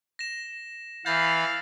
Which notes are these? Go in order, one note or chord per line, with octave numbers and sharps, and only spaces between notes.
A#6 E7
E3 F5 B5 G6 A6 A#6